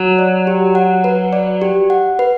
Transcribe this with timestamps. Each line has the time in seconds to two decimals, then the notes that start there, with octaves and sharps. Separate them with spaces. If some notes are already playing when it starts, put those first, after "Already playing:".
Already playing: F#3
0.19 D5
0.47 G4
0.75 F#5
1.04 B4
1.33 D5
1.62 G4
1.90 F#5
2.19 B4